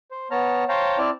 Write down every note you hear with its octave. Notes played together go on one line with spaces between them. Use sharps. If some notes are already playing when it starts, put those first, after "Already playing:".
C5
B3 C#5 A5 A#5 F6
C5 C#5 F5 G5 A5 A#5
C4 E4 D5 A5 F6